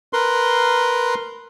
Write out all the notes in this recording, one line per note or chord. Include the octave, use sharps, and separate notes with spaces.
A#4 B4 C6